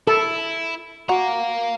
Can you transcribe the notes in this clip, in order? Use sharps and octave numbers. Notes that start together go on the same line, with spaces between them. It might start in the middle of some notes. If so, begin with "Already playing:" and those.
E4 A4
F#4 F5 A#5